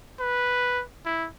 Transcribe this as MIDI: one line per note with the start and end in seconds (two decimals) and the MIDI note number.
0.20 0.83 71
1.06 1.28 64